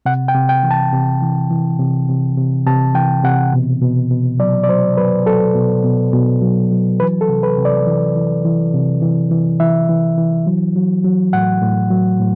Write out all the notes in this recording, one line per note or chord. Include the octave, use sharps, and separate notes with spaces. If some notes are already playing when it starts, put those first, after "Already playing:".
C3 F#5
G5
C3
G5
E3
A5
C3
E3
E3
C3
C3
C3
C3 A5
E3 G5
C3 F#5
B2
B2
B2
F#3 D5
D5
F#3 C5
F#3 B4
F#3 A4
B2
B2
B2
F#3
F#3
E3 B4
A4
C3
B4
C3
D5
E3
E3
E3
C3
E3
E3
E3 E5
E3
E3
F#3
F#3
F#3
A2 F#5
A2
F#3
A2